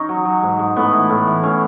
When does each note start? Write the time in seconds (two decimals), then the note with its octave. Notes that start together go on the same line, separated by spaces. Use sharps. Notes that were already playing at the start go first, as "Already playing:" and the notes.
Already playing: C#4 D#4
0.09 F#3
0.25 F#3
0.43 G#2
0.59 G#2
0.76 A2 B3
0.93 E3
1.10 A2
1.27 E3
1.43 A2 C#4